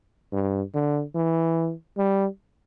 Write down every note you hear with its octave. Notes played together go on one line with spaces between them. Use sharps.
G2
D3
E3
G3